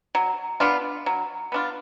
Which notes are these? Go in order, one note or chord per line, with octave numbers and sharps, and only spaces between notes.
F#3
B3 D4 F4
F#3
B3 D4 F4